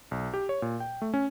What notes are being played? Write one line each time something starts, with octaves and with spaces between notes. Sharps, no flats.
B1
G4
C#5
A#2
G5
A3
C#4